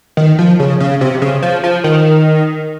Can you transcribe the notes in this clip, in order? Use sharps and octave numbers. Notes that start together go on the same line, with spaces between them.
D#3
F3
C#3
C#3
C3
C#3
F3
F3
D#3